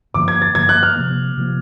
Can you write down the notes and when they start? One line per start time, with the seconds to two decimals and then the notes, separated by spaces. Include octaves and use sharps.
0.14 G2 D3 F3 A#3 D6
0.28 G#6
0.42 A6
0.55 G2 D3 F3 A#3 G#6
0.69 F#6
0.83 F6
0.97 C3 F3 A#3
1.37 C3 F3 A#3